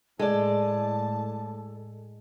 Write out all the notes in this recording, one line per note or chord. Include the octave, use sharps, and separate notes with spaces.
A2 G#3 A4 D5 A5